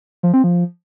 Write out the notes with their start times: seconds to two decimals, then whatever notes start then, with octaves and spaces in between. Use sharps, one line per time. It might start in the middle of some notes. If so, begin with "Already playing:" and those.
0.23 F3
0.34 C4
0.44 F3